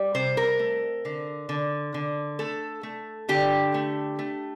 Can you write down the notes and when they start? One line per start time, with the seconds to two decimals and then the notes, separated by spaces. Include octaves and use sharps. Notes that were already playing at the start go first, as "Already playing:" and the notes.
Already playing: G3
0.15 C3 C5
0.37 A#4
0.59 A3
1.05 D3
1.49 D3
1.94 D3
2.39 A3 A4
2.83 A3
3.29 D3 G4
3.74 A3
4.19 A3